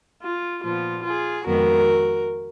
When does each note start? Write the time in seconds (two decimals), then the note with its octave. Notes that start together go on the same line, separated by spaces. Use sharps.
0.23 F4
0.64 A#2 F3 B3 F4
1.05 F4 G#4
1.46 F2 D#3 G#3 B3 F#4 A#4